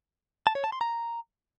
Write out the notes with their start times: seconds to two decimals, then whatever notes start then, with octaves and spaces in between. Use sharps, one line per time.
0.47 A5
0.55 C#5
0.64 A5
0.72 C6
0.81 A#5